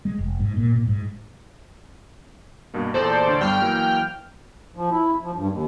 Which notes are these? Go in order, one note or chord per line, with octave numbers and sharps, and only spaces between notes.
G#3
F1
G#2
A#2
A#2
G#2
G2 B2 A#3
E2 A#2 A4 C5 D5
D2 D4 C#5
G2 G3 B3 G5 F6
E3 F#3 A#3
F3
E4
F3
G2
D#2